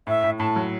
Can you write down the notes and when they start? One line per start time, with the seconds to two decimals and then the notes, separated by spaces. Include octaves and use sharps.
0.07 A2 E5
0.24 A2
0.39 A2 A5
0.56 F#3